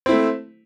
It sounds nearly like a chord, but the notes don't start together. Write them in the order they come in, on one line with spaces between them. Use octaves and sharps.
C4 E4 A3